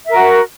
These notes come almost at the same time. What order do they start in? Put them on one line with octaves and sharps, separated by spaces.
E5 A#4 F#4